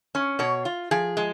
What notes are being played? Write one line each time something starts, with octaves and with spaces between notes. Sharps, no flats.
C#4
B2 C#5
F4
F3 G#4
G#3